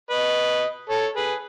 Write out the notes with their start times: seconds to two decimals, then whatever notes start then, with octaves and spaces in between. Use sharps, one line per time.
0.10 B4 D#5
0.90 A4 C#5
1.16 G#4 B4